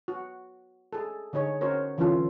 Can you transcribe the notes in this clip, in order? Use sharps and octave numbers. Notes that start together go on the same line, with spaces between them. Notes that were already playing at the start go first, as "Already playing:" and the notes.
F#4
G#4 A4
D3 D#4 G#4 C#5
C#4 F#4 A#4 C5 C#5
D3 E3 F#3 C#4 F4 A4